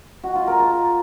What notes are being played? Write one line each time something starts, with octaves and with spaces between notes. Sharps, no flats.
F#4
F4
A#4
A5